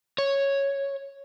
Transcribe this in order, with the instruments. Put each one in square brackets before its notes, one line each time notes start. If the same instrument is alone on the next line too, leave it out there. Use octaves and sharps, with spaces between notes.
[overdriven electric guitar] C#5